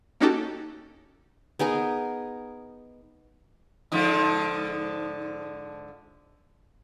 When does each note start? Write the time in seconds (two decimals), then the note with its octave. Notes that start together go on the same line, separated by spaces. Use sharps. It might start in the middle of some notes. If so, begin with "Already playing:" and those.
0.20 A#3 C#4 D#4 F#4 G4 A4
1.59 B3 D#4 G#4 A#4
3.92 G#2 D3 F3